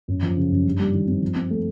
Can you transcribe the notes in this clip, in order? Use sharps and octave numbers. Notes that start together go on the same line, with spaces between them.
F#2
F3
C#3
F#2
G2
G3
D#3
C4
F3
C4
A3